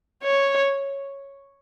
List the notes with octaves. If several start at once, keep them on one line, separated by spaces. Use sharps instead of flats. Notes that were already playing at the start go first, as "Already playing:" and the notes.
C#5